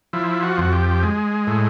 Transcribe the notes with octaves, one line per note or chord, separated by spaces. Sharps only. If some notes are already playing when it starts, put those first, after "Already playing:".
F3 E4
F#4
F2 F#4
G4
G#3
A2